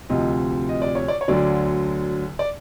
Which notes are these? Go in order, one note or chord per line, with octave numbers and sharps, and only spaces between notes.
D2 C3 F3 D#5
D#5
D5
C#5
D5
C#5
D2 D3 F#3 D5
D5